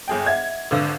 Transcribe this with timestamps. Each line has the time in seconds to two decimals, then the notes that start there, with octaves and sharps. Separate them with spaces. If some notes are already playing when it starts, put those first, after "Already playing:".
0.08 G1 G#4 G5
0.26 D#5 E5 F#5 G#6
0.71 G#1 D3 B4 F5 E6